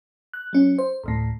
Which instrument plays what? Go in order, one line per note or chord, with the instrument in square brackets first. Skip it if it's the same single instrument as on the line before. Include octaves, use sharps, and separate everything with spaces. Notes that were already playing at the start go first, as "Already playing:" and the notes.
[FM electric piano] F#6
F#3 C#4
C5
A1 D2 A2